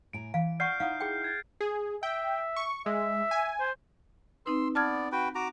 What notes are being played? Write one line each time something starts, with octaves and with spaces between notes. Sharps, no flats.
A2 G#5 A#5 D7
E3 F5 D7
D5 F#5 C#6 F6 G6 C7
D#4 E4 F5 F#5 D#6
G#4 G5
F6 G#6 A6
G#4
E5 G5
C#6
G#3 E5
G#5
C5
C4 D#4 B4 C6 E6
B3 D5 A5 F6 G#6
F#4 B4 G5
F#4 A#5 D6